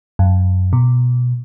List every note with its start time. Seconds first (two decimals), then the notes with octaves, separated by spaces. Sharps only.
0.19 F#2
0.73 B2